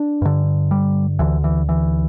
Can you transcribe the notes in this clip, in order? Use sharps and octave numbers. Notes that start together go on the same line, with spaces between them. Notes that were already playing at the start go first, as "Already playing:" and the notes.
Already playing: D4
G2 D3
G3
D2 D3 E3
E3
E3